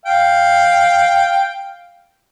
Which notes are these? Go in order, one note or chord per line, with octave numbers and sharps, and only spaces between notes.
F5 G5